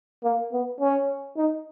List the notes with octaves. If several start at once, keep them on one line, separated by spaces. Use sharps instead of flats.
A#3
B3
C#4
D#4